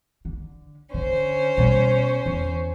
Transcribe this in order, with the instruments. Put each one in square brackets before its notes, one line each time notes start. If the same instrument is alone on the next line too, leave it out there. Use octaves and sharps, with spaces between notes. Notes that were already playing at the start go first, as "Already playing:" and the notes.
[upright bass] D3
[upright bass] D3 [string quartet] C#4 C5
[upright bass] B2 G3
E2